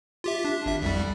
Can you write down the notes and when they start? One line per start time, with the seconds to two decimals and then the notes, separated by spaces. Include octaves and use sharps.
0.24 F4 G4 E5
0.45 D4
0.66 G#1 E5
0.82 C2 F2 G3